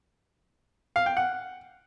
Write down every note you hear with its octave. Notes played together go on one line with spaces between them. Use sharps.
F5
G5
F#5